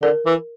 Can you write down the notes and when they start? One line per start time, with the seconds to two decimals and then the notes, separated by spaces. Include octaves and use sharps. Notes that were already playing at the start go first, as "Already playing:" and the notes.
0.02 D3 A#4
0.26 E3